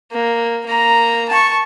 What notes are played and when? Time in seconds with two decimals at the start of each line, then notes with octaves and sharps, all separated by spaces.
0.12 A#3
0.66 A#3 A#5
1.29 A5 C#6